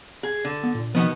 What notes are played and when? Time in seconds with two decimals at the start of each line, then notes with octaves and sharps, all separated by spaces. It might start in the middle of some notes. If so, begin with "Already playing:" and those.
0.23 G#4
0.45 D3
0.64 B3
0.75 A#2
0.95 B2 D#3 F3 B3